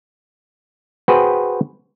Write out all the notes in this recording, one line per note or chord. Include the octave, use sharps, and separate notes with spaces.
F#4 G#4 B4 C5 F#5 G5